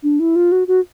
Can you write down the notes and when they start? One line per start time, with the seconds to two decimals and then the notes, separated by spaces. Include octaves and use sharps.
0.03 D4
0.20 E4
0.36 F4
0.52 F#4
0.68 F#4